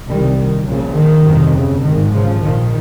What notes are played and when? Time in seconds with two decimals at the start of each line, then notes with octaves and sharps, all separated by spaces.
0.09 C2 C3 D#3 G3
0.38 D#3
0.67 A#1 A#2 C#3
0.96 D#3
1.25 G1 F2 C3
1.55 C#3
1.83 G#1 G#2 D#3
2.13 C#3 F3
2.42 A#1 A#2 D#3